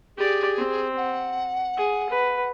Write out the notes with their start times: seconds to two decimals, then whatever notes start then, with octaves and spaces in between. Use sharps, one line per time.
0.17 G4 G#4 D5
0.58 C4
0.97 F#5
1.77 G#4
2.10 B4